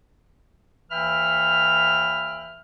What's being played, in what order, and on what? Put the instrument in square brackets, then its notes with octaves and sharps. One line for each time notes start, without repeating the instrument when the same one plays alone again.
[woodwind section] D#2 E3 E5 G5 B5 F6